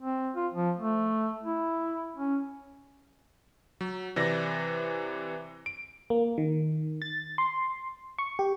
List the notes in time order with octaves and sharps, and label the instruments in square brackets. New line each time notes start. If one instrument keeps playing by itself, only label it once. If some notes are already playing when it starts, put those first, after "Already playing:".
[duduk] C4
F4
F3
A3
E4
C#4
[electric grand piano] F#3
C3 E3 D5 A#6
D7
[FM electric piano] A#3
D#3
A6
C6
C#6
G4